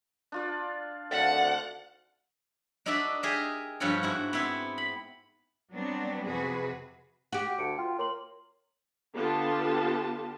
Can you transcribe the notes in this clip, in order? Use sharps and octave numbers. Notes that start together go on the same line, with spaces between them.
D4 F4 D5
G#1 D2 F5 F#5 A5
D4 D#4 F#4 A4 D5 E5
G4 G#4 A#4 D#5 E5
G2 F3 B3 F#4 A4 C#5
G#2 E4 F#4
B3 C4 E4
B5
F#3 G3 B3 C4 D4
F2 C3 F#4 G#4 B4
F#4 G4
D2 C#7 D7
F4 G5
A#3 C#5 C6 F#7
D3 B3 F4 G4 A5